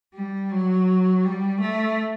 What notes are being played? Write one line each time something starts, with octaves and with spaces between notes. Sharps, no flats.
G3
F#3
G3
A3